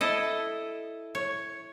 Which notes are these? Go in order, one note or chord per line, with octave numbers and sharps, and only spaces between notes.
E4 A4 D#5
C#5